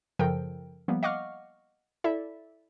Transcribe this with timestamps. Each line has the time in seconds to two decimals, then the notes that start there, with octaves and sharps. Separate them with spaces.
0.19 F#2 C#3 F3 A4 A#4 G5
0.88 F3 G3 A#3 B3
1.03 D#5 F5 F#5 C#6 D6 F6
2.04 E4 A4 D5 E5